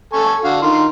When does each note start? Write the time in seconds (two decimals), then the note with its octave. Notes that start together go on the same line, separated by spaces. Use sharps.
0.13 A4 G#5 C#6
0.44 D3 F#4 F5
0.62 D#3 F4 C6